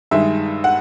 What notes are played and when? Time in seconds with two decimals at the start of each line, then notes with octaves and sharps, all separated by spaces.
0.11 G2 D#3 G#3 E5
0.64 F#5